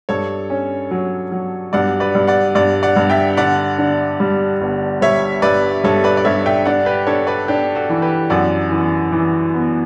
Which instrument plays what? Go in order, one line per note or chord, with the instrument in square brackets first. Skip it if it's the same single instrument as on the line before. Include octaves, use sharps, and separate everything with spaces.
[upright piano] G2 [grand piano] A4 C#5
[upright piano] C#4
F#3
F#3
[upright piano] G2 [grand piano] D5 F#5
[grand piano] B4 D5
[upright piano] G2
[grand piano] D5 F#5
[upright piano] G2 [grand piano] D5 F#5
[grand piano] D5 F#5
[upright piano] G2
[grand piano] E5 G5
[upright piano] D3 [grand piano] D5 F#5
[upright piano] D3
G3
G1
[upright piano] G3 [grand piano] C#5 E5
[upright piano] G2 [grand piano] B4 D5
[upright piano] G2 [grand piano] A4 C#5
[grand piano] B4 D5
D5
[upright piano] G2 [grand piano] C#5 E5
[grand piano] E5 G5
[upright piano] D4 [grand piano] D5 F#5
[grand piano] G4 B4
[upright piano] D4 [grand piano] A4 C#5
[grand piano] B4 D5
[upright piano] D4 [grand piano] G4
[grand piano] F#4 A4
[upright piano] E3
[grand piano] G4 B4
[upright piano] F#2 [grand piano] D5 F#5
[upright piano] E3
E3
B3